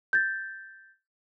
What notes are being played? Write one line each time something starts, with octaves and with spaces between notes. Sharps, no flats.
G6 A6